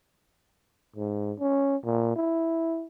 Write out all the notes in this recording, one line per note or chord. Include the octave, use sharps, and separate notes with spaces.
G#2
C#4
A#2
E4